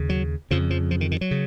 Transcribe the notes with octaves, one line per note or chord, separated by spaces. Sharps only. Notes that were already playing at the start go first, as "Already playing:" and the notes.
Already playing: D#2 C#3
F#3
F2 C#3 F3
F3
F3
D#3
D#3
F#3
C#3